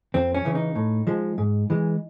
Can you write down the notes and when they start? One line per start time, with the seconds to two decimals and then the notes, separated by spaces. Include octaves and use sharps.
0.14 F2 C4
0.34 C#4
0.45 C#3 E3
0.55 D#4
0.75 A2
1.07 F3 G#3
1.38 G#2
1.70 E3 G#3